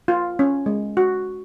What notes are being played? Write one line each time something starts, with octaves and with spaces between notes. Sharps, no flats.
F4
C#4
G#3
F#4